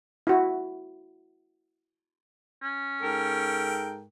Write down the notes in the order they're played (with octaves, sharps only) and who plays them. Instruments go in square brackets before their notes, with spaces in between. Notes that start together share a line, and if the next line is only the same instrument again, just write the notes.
[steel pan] E4 F#4
[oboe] C#4
[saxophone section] G#2 A4 A#4 [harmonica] G5